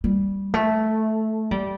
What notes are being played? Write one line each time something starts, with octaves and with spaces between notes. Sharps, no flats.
G3
A3
G3